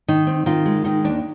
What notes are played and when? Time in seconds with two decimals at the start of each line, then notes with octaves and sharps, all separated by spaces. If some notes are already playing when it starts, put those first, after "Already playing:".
0.08 D#3 D#4
0.27 C4
0.46 D#3 F4
0.66 G#3
0.84 D#3 D#4
1.04 D#2 D4